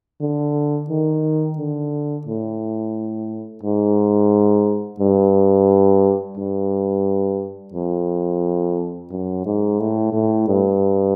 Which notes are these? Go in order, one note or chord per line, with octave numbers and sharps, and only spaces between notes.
D3
D#3
D3
A2
G#2
G2
G2
F2
F#2
G#2
A2
A2
G2